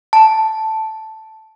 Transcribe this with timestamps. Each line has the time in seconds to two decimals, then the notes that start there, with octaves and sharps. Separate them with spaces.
0.13 A5